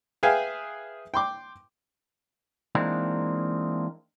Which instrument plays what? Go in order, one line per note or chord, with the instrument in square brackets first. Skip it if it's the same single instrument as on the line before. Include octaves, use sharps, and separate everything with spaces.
[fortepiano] G#4 B4 E5 F5 G5 G#5
G5 C6 D6
[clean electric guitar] E3 G#3 A#3 C4 D4 D#4